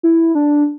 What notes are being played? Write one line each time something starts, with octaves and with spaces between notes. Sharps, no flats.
E4
D4